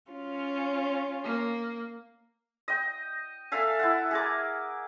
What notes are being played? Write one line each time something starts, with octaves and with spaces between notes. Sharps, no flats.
C#4 F4
A#3
D#5 G5
A4 E5 F5 G#5
E4 F#5
G#4 A#4 D6